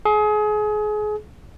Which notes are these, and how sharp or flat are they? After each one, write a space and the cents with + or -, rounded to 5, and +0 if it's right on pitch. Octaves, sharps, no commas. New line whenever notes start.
G#4 +30